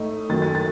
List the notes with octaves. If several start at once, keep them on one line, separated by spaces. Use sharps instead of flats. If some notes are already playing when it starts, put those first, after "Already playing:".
Already playing: A2 A3 D#4
F#2 D#3 F#3 A3 A6
A6
A6